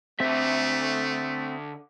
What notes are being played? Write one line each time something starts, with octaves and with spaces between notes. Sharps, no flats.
D3 A3 C4 E5